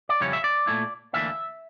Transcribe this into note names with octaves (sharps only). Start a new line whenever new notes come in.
D5
F2 C#3 G3 C#4 E4 C#5
E5
D5
A#2 A3 E4
D2 C#3 E3 A#3 D4 E5